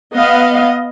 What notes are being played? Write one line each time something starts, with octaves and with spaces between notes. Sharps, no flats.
B3 D#5 F5